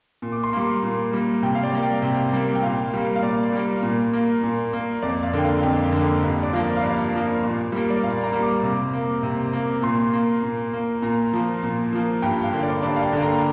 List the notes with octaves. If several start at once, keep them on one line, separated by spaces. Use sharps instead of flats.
A#2
D6
C6
G3 A#3
A#2
G3 A#3
C3 G5
F5
D5
G3 A#3
G5
C3
G3 A#3
G5
A#2 F5
G3 A#3
F5
A#2 D5
G3 A#3
A#2
A#3
A#2
A#3
F2 D5
F5
D3 A#3 G5
F5
F2 G5
D3 A#3
G2
D5
F3 A#3 F5
F5
G2 D5
F3 A#3
A#2
G3 A#3
D5
A#2 F5
A#5
G3 A#3
D6
C3
A#3
C3
A#3
A#2 C6
A#3
A#2
A#3
A#2 A#5
F3 A#3
A#2
F3 A#3
G2 G5
F5
D3 A#3
D5
G2 D5
F5
G5
D3 A#3
A#5